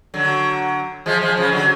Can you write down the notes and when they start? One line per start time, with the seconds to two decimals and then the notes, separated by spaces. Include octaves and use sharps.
0.14 D3 F#3
1.06 F3 G#3
1.21 F3 G#3
1.37 C#3 F3
1.52 D3 F#3